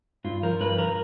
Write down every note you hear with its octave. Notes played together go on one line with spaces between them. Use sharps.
G2 F4
F3 A#4
G2 B4
F3 A#4